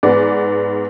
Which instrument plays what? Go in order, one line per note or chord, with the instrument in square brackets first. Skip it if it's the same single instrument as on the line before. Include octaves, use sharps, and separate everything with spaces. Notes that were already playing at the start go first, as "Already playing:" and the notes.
[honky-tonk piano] G#2 B3 D5